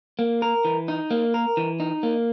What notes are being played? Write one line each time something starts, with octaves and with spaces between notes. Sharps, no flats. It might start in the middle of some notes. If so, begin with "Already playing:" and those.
A#3
A#4
E3
D#4
A#3
A#4
E3
D#4
A#3